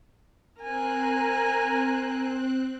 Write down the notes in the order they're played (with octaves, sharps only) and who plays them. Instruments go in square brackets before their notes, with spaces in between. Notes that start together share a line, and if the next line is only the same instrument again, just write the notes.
[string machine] C4 F#6 [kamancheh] A#4 G#5